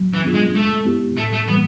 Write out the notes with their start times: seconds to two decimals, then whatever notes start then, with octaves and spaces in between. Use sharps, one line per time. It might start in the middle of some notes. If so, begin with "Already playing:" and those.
Already playing: F#3
0.14 E3
0.24 B3 D4 F4 G#4
0.34 G#3
0.55 G#3 A3
0.85 B3 E4 G4
1.17 A2 A3
1.33 A3
1.48 E3 G3 A#3 B3